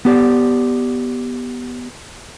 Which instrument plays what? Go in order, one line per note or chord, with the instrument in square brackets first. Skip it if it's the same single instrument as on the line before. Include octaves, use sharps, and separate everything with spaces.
[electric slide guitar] B3 G4 D5